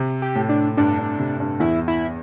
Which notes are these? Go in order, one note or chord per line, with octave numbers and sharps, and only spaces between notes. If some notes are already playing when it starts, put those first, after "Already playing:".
Already playing: C3
G4
A2
D4
G2 D4
G2
C3
G2
E2 E4
E4